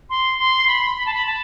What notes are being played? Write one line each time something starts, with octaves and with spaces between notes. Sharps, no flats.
C6
C6
B5
B5
A5
B5
A5